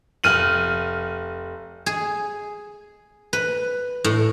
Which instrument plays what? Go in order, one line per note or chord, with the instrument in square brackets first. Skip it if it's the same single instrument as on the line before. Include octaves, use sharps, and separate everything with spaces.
[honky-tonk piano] F1 F6 D#7 F#7
[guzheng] G#4
B4
A2